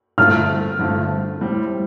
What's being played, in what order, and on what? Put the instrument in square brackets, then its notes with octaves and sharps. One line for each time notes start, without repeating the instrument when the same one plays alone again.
[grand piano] G2 D3 A3 C4 F4 [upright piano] F6
[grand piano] G2 D3 A3 C4 F4
A2 G3 C4